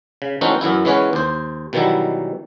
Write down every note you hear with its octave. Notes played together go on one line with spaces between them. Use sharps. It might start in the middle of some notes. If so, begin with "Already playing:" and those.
C#3
E3 A3 C4 C#4 D#4 F#4
F#2 E3 B3 E4
E3 G#3 B3 C#4 B4 C#5
D#2 C5
B2 D#3 E3 F#3 G3 E4